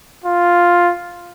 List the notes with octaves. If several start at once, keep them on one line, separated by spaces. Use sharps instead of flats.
F4